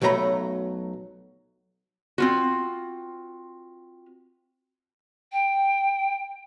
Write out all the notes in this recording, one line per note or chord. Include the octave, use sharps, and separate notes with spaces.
B1 F#3 A3 C5 A#5 B5
C4 F4 F#4
G5